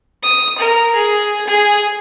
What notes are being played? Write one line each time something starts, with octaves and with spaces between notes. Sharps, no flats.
D#6
A#4
G#4
G#4